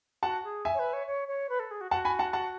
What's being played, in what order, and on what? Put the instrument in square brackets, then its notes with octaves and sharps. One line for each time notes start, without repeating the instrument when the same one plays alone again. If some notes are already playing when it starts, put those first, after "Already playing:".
[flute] F#4 [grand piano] F#5 A5
[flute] G#4
[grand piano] E5 G#5
[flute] C#5
B4
C#5
C#5
C#5
B4
A4
G#4
F#4
[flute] F#4 [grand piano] F#5 A5
[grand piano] G#5 B5
F#5 A5
F#5 A5